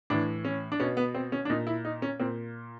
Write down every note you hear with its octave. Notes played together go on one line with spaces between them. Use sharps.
A2 E3 D4
C#4
D4
B2 C#4
B3
C4
C#4
D4
A#2 D#4
E4
D#4
C#4
A#2 C4